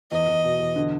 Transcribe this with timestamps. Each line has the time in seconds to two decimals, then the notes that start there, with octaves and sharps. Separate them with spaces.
0.12 E2 D#5
0.28 E2
0.44 B2
0.60 E2
0.76 D3